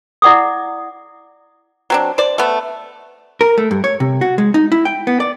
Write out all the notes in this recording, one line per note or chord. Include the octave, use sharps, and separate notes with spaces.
E4 D5 F#5 D6 D#6
F#3 C4 D4
C5 D5
A3 B3
A#4
A3
G2
C#5
C3
F#4
G#3
D#4
E4
G5
B3
D5